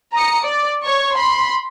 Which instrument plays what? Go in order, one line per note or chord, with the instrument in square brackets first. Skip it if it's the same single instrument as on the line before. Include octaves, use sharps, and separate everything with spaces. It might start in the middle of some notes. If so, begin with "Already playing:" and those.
[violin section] A#5 D#6 C#7
D5
C#5 C#6
B5 C6